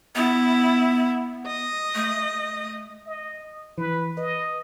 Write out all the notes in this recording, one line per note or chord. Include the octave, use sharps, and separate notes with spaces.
B3 E4
D#5
A3
D#5
E3 B4
B4 D#5